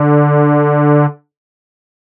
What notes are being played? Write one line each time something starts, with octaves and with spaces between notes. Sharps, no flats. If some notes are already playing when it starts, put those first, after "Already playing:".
Already playing: D3